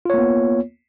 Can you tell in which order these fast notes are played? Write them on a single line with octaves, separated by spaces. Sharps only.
F4 C#5 A#3 B3